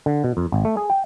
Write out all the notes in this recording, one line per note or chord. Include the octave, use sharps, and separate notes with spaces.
D3
B2
F2
G#1
A3
G#4
G5